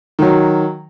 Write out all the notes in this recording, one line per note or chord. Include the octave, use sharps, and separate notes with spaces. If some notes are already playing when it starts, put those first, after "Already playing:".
D#3 F#3